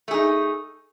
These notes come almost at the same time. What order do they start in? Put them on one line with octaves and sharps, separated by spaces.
A3 G#4 D#4